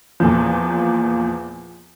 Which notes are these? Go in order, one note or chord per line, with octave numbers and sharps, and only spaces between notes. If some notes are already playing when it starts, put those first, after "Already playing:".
E2 A#2 F3